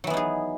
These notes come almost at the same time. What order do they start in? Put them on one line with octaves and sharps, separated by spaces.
F#3 E3 B3 D#4 G#4